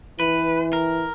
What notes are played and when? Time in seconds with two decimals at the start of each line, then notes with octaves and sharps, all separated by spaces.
0.20 E3 B4
0.73 A#4